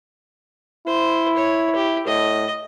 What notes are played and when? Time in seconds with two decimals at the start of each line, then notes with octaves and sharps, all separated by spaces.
0.87 E4 C5
1.37 C#5
1.76 G4
2.07 A2 D#5